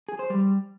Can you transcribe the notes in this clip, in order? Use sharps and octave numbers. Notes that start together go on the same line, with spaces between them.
G#4
C5
G3